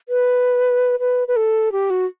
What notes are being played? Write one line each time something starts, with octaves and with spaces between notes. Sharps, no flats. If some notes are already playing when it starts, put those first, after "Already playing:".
B4
B4
B4
A4
G4
F#4